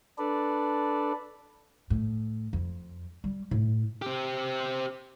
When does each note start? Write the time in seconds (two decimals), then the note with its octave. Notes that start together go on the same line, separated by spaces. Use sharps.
0.18 D4 A4 B4 D5
1.90 A2
2.53 F2
3.24 G3
3.51 A2
4.02 C4 G4